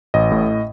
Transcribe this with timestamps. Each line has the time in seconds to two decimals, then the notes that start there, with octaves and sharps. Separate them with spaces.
0.14 A1 D#5
0.32 A2